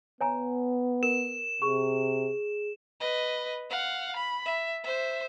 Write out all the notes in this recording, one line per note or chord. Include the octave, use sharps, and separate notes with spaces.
B3 C#5 G#5 A#5
A#4 E7
C3 G#4 C#6
B4 D#5
F5 F#5
B5
E5
C5 E5